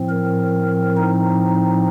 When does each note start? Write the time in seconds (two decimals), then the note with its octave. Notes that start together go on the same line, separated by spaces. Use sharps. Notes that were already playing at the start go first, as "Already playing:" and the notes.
Already playing: A2 F3 C4
0.09 A#4
0.97 D#4